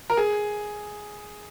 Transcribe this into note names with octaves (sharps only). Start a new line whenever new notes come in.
A#4
G#4